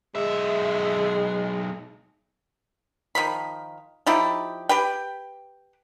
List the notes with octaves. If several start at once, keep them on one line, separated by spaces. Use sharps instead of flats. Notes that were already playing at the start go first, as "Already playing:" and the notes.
B1 G#3 E5
D#3 F3 B5
F3 D#4 E4 G4
G4 B4 G5